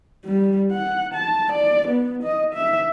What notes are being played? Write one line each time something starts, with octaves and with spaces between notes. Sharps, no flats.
G3
F#5
A5
D5
B3
D#5
E5